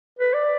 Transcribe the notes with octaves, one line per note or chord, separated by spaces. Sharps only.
B4
D5